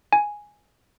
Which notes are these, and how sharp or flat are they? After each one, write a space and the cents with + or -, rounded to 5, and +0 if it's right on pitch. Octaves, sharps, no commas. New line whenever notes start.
G#5 +0